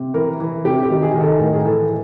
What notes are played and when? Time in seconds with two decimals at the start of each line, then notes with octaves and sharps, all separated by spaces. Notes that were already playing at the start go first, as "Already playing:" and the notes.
Already playing: C3
0.14 E3 A#4
0.40 E3
0.65 C3 G4
0.83 G4
0.90 D#3
1.02 G#4
1.14 D#3
1.21 A4
1.39 A2 A#4
1.53 G#4
1.65 E3 A4
1.89 E3